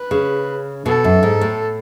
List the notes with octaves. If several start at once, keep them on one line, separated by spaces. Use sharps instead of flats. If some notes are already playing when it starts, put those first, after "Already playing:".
Already playing: B4
C#3
B2 A4
F#2
G#2
A2